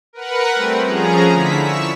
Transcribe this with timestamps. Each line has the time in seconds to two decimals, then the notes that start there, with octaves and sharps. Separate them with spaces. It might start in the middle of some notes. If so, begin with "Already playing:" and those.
0.13 A#4 B4 F#5
0.55 G3 A3 C4
0.85 F3 C#4 G#4 A#5
1.31 D3 E4 B6
1.61 C#6 E6